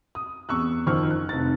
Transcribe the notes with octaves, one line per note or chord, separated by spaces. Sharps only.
D#6
E2 C#6 E6 F#6
F#1 D#3 F3 C5 C#6 F6
F#6
F1 D#4 A6